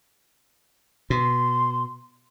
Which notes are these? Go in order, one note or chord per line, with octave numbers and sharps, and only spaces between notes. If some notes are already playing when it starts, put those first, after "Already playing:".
B2 C6